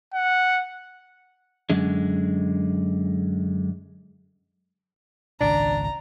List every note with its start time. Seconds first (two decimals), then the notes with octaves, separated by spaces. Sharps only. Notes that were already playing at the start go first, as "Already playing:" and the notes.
0.13 F#5
1.70 F#2 D3 G#3
5.41 G#1 C#2 A#2 D4 A#5